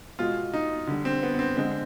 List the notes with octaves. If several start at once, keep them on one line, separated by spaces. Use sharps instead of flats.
B2 G#3 F4
D#4
D3 G3
C4
B3
B3
C4
D3 G#3 C4